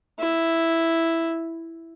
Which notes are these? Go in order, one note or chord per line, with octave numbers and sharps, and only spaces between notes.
E4